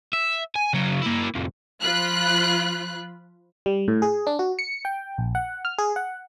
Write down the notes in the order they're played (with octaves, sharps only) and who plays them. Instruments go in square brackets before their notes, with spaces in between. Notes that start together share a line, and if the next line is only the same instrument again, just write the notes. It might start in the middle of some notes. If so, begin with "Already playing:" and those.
[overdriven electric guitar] E5
G#5
C#3 F#3
A#3 E4
C2 F2
[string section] F3 F4 B5 F#6
[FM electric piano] G3
A2
G#4
D4
F#4
C#7
G5
A#1
F#5
F6
G#4
F#5